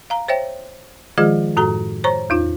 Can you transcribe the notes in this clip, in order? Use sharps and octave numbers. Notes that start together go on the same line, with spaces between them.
F5 A#5
C5 C#5 E5 G5
D#3 F3 G#3 F4 G#4 D#5
F#2 A2 F#4 A4 A#5
C5 C#5 A#5 C#6
E2 D#4 F4